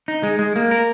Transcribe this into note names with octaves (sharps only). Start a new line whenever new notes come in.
D#4
G#3
G#3
A#3
A#4